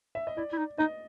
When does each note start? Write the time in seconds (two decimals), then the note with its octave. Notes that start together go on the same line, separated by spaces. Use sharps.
0.15 E5
0.27 D#5
0.37 E4 D5
0.53 E4
0.58 D#4
0.78 D#4 D#5